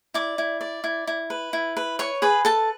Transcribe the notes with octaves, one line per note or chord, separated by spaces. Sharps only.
E4 D5 D6
E4
D5
E4
E4
B4
E4
B4
B4 C#5 C#6
G#4 B4 B5
A4 B4 A5